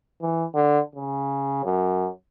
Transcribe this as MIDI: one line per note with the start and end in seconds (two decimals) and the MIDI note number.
0.22 0.45 52
0.55 0.79 50
0.95 1.64 49
1.64 2.08 42